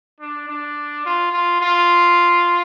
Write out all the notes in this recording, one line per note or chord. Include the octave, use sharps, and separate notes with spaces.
D4
D4
F4
F4
F4